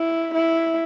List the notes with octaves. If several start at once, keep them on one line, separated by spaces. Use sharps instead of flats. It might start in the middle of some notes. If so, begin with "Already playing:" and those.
Already playing: E4
E4